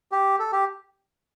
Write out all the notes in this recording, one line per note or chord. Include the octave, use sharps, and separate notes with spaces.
G4
A4
G4